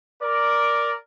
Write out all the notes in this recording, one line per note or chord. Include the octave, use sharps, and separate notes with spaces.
A#4 D5